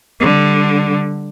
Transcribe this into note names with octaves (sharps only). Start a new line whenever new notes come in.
D3 G3